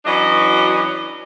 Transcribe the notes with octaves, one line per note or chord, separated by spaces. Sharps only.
E3 F#3 C#4 D4 F#4 D#5